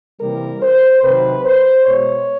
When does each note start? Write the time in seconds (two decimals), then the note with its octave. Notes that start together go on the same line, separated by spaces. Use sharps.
0.20 C3 E3 G3 A#3 A#4
0.62 C5
1.03 C3 D#3 F#3 B4
1.45 C5
1.85 B2 G#3 C#5